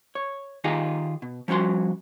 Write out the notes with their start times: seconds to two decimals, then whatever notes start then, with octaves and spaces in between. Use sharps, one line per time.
0.15 C#5
0.64 D#3 D#4 F4 G4 G#4
1.22 B2
1.48 F3 G3 C#4 F#4 C6